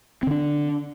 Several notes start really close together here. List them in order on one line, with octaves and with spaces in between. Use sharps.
C4 D3 D4